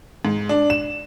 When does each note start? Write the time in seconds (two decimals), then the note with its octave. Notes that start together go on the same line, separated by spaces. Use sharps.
0.25 G#2
0.49 D4
0.70 E7